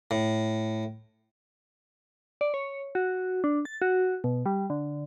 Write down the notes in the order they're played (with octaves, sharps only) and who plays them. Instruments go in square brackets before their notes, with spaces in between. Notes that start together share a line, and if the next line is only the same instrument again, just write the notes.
[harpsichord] A2
[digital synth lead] D5
C#5
F#4
D4
A6
F#4
B2
G3
D3